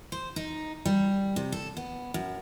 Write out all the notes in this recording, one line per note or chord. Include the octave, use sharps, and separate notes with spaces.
C5
D#4
G3
C3
A4
B3
F#2